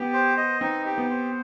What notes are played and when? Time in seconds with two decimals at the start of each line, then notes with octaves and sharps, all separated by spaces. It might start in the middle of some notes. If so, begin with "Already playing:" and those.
Already playing: B3 G4
0.13 C5
0.37 D#5
0.61 C4 D#4
0.86 G4
0.98 B3
1.10 C5